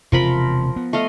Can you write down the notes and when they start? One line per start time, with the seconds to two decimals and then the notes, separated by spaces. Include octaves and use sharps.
0.12 E1 C3 F3 A#4 B5
0.76 B3
0.93 A3 D#5 F5